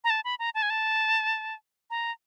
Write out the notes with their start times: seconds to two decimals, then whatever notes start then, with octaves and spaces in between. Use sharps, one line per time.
0.04 A#5
0.10 A5
0.25 B5
0.39 A#5
0.55 A5
0.62 G#5
0.70 A5
1.90 A#5